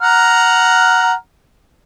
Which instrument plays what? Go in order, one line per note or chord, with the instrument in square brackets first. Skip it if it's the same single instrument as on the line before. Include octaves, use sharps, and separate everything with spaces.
[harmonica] F#5 A#5 F6